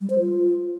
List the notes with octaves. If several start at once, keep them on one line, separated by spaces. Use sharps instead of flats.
G3
C5
F4